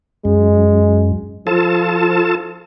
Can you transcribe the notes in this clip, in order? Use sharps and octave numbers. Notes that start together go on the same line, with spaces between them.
F#2 G#3
F3 F4 A4 A5